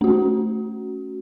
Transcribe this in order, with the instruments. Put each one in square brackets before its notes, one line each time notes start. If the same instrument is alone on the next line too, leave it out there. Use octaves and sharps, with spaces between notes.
[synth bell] A3 C#4 F#4